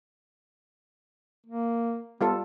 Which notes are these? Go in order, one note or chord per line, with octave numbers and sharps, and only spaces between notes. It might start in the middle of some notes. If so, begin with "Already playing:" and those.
A#3
G3 B3 F4 A4